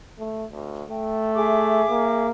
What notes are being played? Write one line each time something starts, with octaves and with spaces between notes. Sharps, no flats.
A3
D2
A3 G5
G#4 E5 D6
A#3